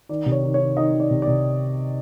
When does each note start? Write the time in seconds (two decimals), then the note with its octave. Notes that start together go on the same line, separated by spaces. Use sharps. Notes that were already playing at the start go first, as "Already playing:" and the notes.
0.09 D#3 D5
0.26 C3
0.32 C#5
0.43 D#3
0.54 C#5
0.60 D#3
0.77 D#3 D#5
0.94 D#3
1.00 D5
1.11 C3
1.22 D5
1.27 C3